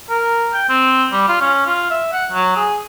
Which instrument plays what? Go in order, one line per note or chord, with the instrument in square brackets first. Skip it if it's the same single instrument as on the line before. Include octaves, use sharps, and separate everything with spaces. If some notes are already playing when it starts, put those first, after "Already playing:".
[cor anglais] A#4
G5
C4
G3
F4
C#4
F4
E5
F#5
F#3
G#4